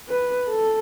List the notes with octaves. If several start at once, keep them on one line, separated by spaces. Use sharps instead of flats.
B4
A4